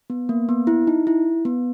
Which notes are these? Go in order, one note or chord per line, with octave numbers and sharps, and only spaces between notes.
B3
A#3
B3
E4
D#4
E4
B3